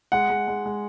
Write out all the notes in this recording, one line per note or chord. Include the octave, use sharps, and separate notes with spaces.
G#3 F#5
G#3
G#3
G#3